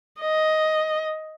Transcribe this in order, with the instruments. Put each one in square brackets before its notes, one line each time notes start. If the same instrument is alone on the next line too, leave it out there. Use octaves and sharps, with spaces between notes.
[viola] D#5